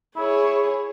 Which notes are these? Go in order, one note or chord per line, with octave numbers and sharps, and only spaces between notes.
E4 G#4 C#5